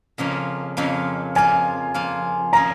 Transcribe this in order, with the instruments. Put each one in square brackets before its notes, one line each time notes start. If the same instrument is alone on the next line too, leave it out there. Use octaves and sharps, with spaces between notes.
[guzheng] F2 C#3 F3 A#3
F2 C#3 F3 A#3
[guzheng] F3 A#3 F4 [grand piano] G#5
[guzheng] F3 A#3 F4
[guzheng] F3 C#4 G#4 [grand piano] A#5